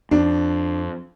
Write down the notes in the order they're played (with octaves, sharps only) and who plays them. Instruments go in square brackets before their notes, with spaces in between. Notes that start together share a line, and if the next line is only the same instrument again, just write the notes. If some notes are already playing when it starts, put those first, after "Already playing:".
[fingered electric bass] F2 [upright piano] D4